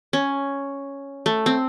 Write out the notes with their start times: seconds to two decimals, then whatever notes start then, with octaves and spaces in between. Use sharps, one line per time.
0.13 C#4
1.26 A3
1.46 C4